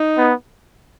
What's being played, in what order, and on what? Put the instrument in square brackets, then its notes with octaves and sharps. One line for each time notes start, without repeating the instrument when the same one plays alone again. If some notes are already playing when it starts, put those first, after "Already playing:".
Already playing: [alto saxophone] D#4
[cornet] B3